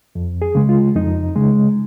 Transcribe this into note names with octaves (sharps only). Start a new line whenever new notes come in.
F2
G#4
C#3 G#3
F4
F2 D#4
C#3 G#3